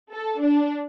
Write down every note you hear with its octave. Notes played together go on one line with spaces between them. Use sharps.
A4
D4